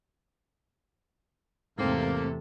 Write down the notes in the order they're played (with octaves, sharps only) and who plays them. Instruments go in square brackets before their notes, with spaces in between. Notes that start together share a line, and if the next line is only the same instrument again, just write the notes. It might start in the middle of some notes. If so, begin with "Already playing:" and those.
[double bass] E2 C3 [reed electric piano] G#2 C4 [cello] A3 A4 [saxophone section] A#3